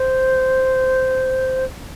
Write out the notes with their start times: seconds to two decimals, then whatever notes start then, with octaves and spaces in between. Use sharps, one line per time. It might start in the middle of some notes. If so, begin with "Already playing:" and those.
Already playing: C5